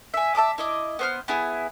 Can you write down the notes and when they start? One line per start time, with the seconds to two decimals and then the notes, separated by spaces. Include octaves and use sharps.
0.14 E5 G#5
0.35 E5 A5 D6 D#6
0.58 E4 D#5 D6
0.99 B3 C5 F6
1.28 B3 E4 G#4